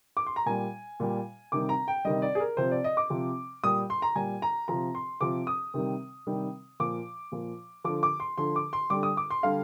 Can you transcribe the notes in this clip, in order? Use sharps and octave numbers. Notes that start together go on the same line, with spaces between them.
D6
C6
A#5
A#2 G3 G#5
A#2 G3
C3 D#3 G3 D6
A#5
G5
C3 D#3 G3 D#5
D5
G#4
A#4
C3 F3 C5
D5
D#5
D6
C3 F3
A#2 G3 D#6
C6
A#5
A#2 G3 G#5
A#5
C3 F3 A#5
C6
C3 F3 D6
D#6
C3 D#3 G3
C3 D#3 G3
A#2 F3 D6
A#2 F3
D3 F3 D6
D6
C6
D3 F3 C6
D6
C6
D3 G3 D6
D#6
D6
C6
D3 G3 F5